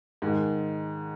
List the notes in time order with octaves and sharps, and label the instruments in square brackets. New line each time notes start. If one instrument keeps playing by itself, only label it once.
[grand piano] G#2 D#3 G#3